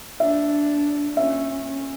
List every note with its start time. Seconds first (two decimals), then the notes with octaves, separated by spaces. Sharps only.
0.20 D4 E5
1.16 C#4 E5
1.64 C#4